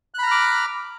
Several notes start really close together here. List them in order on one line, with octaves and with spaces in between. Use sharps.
F#6 B5 A#5 F6 D6